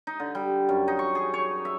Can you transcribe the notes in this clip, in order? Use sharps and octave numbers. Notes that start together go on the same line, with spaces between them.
D#4
D3
G3
F#2
D#4
C#6
G#4
C#5
E5